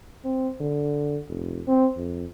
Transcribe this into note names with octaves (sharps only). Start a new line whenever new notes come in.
C4
D3
F1
C4
F2